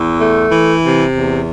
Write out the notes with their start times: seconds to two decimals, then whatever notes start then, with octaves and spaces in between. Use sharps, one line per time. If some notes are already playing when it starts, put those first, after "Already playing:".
Already playing: E2
0.20 A3
0.52 E3
0.84 C3
1.15 E2